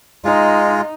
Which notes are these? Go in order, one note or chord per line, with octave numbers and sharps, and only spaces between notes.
G#3 D#4 F4